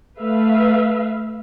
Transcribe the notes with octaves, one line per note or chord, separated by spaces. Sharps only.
A3 B4 E5 F5